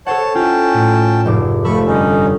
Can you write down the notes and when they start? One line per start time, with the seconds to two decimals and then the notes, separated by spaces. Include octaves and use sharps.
0.06 A4 C5 C#5 F#5 A5
0.35 C#4 E4 F4 G5 A5
0.74 A2
1.26 F1 G#2 D6
1.65 F3 A3 A4 B5 C#6
1.87 G2 D3 C#4 D#4